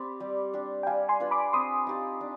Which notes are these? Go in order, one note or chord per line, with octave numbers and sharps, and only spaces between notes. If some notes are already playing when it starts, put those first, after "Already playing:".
Already playing: C4 G4 D5 B5
G3
D4 G4
G5
G3 F5 G#5
G#5 C6
D4 F4 B4
B5 D6
C4 C6 D#6
D#4 G4 D5
D4